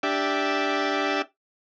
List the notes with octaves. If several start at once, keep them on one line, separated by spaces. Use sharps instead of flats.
D4 G4 E5